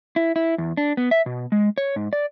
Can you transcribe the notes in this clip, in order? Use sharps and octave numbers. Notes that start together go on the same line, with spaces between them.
E4
E4
E2
D4
B3
E5
B2
G#3
C#5
G#2
D5